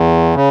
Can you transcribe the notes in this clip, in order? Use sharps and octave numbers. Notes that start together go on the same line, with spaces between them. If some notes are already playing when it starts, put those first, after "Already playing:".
Already playing: E2
C#3